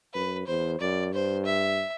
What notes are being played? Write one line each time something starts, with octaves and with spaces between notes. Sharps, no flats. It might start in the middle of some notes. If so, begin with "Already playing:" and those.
F#2 B4
E2 C5
F#2 D5
G2 C5
E5